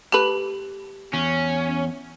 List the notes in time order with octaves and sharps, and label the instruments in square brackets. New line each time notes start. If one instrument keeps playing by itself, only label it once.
[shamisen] A3 B4 [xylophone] G4 F#7
[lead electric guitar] E2 [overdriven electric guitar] C#4